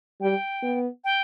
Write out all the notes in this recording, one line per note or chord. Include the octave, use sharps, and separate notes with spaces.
G3 G5
B3
G5